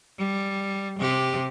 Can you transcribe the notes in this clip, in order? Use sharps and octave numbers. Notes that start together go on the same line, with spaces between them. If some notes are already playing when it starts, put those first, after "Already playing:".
G3
C3 G4